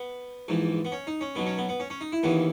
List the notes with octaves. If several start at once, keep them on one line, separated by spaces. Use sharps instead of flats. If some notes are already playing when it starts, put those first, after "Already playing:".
Already playing: B3
A#1 G#2 E3
B3
C#4
D#4
C#4
B1 B2 F#3 B3
C#4
B3
B3
C#4
C#4
D#4
E4
D#2 C#3 E3 B3